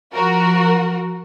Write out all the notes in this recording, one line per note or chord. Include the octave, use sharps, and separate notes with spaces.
F3 F#4 A#4